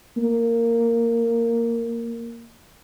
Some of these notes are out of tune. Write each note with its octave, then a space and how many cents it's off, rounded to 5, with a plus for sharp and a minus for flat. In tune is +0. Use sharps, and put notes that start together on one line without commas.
A#3 -10